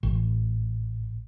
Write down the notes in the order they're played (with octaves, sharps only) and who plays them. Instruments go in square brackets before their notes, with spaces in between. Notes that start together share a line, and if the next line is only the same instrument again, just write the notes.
[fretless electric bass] A1